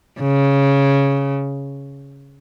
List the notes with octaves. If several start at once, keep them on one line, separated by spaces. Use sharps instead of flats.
C#3